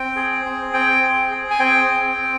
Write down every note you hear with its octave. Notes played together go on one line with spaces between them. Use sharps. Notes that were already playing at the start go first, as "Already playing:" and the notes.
Already playing: C4 G5
G#4
C4
C4 G5
G#4
G#4
G#5
C4 G5
C4
C4